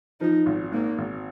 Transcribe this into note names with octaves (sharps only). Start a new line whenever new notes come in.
F3 D#4
G#1
G#2 A#3
G#1